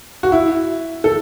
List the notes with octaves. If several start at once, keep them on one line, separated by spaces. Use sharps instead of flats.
F#4
E4
A4